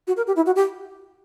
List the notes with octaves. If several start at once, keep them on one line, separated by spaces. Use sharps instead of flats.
F#4
A#4
G4
E4
F#4
G4